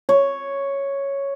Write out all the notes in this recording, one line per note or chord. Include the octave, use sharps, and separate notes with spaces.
C#5